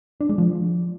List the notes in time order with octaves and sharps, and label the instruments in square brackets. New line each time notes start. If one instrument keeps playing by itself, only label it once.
[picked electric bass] D4
G#3
F3